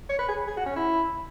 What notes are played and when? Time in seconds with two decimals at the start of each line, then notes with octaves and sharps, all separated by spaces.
0.10 C#5
0.19 B4
0.29 G#4
0.47 G#4
0.57 F#4
0.66 C#4
0.76 E4